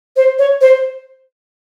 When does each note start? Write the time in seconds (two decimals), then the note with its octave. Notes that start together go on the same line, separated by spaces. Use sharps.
0.16 C5
0.39 C#5
0.61 C5